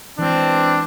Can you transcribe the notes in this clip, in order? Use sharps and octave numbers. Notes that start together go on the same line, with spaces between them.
E3 G#3 C4 D4